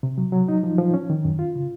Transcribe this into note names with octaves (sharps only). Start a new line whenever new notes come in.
C3
F#3
F#3
D#4
F3
F3
C#4
D#3
F#2
F4
C#3